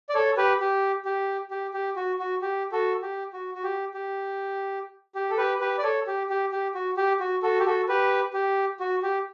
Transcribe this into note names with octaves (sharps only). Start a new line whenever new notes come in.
D5
A4 C#5
G4 B4
G4
G4
G4
G4
F#4
F#4
G4
F#4 A4
G4
F#4
F#4
G4
G4
G4
A4
G4 B4
G4 B4
D5
A4 C#5
G4
G4
G4
F#4
G4
F#4
F#4 A4
G4
F#4 A4
G4 B4
G4
F#4
G4